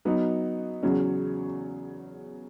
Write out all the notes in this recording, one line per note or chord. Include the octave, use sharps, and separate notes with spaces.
F#3 B3 D#4
E2 C#3 F#3 C#4